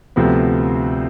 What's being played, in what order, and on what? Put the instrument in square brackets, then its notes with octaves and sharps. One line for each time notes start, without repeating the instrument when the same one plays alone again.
[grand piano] D2 C3 F3 B3